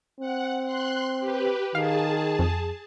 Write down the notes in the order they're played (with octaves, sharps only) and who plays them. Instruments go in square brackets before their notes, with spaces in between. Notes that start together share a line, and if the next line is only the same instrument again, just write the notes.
[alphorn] C4 [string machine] F#5
[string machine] C6 F#6
G4 B4
[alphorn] D#3 [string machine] G#4 A5 [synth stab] F5
[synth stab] F2